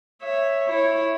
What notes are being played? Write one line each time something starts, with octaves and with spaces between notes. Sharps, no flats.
C#5 E5
E4 C#5